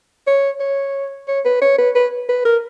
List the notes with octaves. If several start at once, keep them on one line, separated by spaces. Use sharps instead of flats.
C#5
C#5
C#5
B4
C#5
B4
B4
B4
A#4